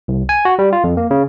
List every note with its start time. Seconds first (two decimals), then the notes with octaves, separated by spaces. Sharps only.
0.08 C2
0.29 G#5
0.45 F#4
0.59 G3
0.73 F4
0.84 F2
0.97 A#3
1.11 C#3